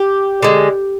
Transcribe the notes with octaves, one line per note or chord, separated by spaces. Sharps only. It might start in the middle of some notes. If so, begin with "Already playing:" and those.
Already playing: G4
D3 G#3